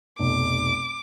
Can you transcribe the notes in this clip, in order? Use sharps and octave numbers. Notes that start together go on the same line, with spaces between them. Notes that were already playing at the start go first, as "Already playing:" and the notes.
F1 B1 D6